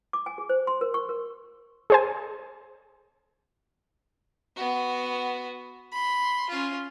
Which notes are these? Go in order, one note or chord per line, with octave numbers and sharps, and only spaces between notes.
D6
G#5
G#4
C5
C6
A#4
C#6
A#4
G#4 C5 G#5
B3 F#4
B5 C6
C#4 F4